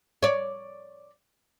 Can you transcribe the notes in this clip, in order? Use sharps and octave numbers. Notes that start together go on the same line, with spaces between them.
C#5 D5